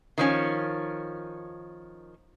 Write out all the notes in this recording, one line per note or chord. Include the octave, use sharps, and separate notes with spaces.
D#3 F3 C#4